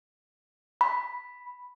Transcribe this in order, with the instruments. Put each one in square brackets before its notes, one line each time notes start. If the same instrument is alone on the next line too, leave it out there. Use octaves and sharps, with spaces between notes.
[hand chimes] B5